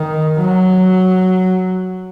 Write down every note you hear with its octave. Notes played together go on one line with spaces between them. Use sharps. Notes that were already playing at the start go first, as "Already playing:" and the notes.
Already playing: D#3
F#3